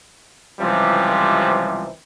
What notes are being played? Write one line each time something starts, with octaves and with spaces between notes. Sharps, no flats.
C#2 C3 E3 F3 G3